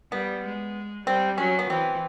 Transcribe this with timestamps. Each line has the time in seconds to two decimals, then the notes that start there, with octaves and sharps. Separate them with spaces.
0.12 G3 B3
0.44 G#3
1.07 G3 C4
1.38 F#3 C#4
1.59 B3
1.69 E3 C4